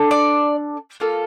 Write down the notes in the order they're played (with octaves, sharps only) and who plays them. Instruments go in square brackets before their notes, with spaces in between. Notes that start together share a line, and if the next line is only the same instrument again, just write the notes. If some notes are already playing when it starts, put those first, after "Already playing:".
Already playing: [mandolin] D4 A4
D5
A#3 F4 A4